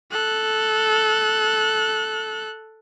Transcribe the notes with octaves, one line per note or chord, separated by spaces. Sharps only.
A4 F#6